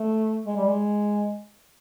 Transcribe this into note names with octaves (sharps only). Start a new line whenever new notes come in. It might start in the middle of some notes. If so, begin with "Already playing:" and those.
Already playing: A3
G#3
G3
G#3